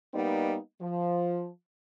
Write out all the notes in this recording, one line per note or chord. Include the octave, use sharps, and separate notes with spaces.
G3 A#3 B3 D#4
F3